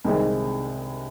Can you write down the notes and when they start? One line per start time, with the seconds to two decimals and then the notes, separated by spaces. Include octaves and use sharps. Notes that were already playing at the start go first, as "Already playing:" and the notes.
0.04 C2 C3 D#3 G#3 C4